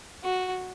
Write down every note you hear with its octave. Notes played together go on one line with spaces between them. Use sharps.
F#4